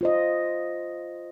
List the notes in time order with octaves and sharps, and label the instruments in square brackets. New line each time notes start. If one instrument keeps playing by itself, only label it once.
[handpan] F4 C5 D#5